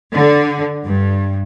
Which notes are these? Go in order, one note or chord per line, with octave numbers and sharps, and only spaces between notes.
D3
G2